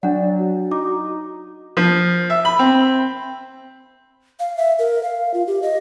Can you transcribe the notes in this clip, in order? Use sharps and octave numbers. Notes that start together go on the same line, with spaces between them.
F#3 D4 D5 F#5
F#4
D#4 D6
F3
E5
B5
C4
F5
E5
A#4
F5
F4
G4
D#5